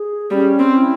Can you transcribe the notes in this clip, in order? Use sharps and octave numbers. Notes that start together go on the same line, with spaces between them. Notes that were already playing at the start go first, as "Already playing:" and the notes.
Already playing: G#4
G3 C#4
C4
E4